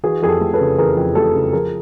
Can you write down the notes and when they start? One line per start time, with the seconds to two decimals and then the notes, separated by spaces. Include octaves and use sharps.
0.03 E3 F#4 G#4
0.22 F2 G#4
0.28 G4 A4
0.41 A3
0.53 A4 B4
0.60 C#3
0.78 E3 G#4 A#4
0.97 F2
1.15 A3 G4 A4
1.35 C#3
1.53 F3 G#4 A#4